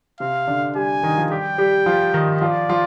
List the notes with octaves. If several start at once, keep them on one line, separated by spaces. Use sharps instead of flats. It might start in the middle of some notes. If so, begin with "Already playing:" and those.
C3 C4 F5
D3 D4
G3 G4 G#5
D#3 D#4
F3 F4
G3 G4 G5
G3 G4
F3 F4
D#3 D#4
F3 F4 D5
F3 F4